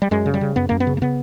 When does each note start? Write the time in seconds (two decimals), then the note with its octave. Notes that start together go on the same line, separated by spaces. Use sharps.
0.02 G3
0.11 F#2 G#3
0.26 C#3
0.34 G3
0.41 C#3
0.56 F#2 B3
0.69 F#2 A#3
0.80 B3
0.87 C#3
0.97 A#3
1.02 C#3 B3